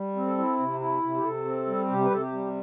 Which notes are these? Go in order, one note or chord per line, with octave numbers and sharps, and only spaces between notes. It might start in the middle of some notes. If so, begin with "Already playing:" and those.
Already playing: G3
C4
A4
E4
C3
E4
C3
G4
C3 A4
C4
G3
C3 G4
B4
C3 A4
G4
G3